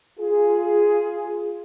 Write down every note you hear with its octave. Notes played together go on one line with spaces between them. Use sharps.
F4 G#4